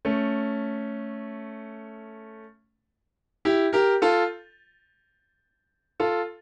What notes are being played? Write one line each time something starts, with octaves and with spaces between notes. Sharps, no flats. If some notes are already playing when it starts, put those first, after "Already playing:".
A3 C#4
E4 G4
G4 A#4
F4 A4
F4 A4